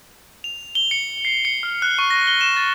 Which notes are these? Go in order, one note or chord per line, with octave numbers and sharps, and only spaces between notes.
F7
G7
C#7
C7
C#7
F6
F#6
C#6
A#6
G7
E7
A6